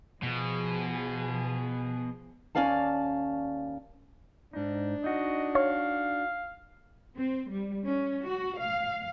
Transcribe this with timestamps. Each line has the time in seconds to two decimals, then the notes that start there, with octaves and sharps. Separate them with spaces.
0.23 B2 F3 G#4
2.55 D#2 G#3 C#4 D5 F5 A5
4.53 G#2 D4 D#4
5.04 D#4 F#4 D#5
5.55 C#5 F5
7.17 C4
7.51 G3
7.86 C#4
8.26 F#4
8.56 F5